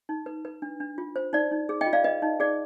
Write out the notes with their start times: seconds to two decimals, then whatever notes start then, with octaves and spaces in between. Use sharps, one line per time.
0.09 D#4
0.26 B4
0.45 B4
0.62 D4
0.80 D4
0.98 F4
1.16 C5
1.33 D#4 D5
1.52 D#4
1.69 G#4
1.81 D#5 G5
1.86 F4
1.93 D5 F5
2.04 B4 D#5
2.22 D#4
2.40 G#4 D5